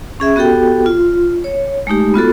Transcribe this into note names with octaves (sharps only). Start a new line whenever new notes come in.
C#4 G#4 E5
B3 F#4 G4 A4 G5
F4
C#5
G#3 A3 D#4 G4
B3 F4 F#4 A4